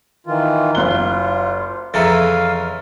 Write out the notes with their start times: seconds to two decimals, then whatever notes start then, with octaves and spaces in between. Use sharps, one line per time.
0.27 D#3 E3 F4
0.75 F#1 F4 F#6 G7
1.94 F2 C#3 E3 E5 F5 A#5 A6